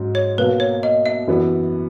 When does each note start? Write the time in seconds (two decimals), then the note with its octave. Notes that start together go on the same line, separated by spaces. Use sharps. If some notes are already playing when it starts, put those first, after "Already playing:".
Already playing: G#2 F#3 C#4
0.15 C#5
0.38 B1 B2 A#3 B4
0.60 C#5
0.83 D#5
1.06 E5
1.27 F#2 E3 B3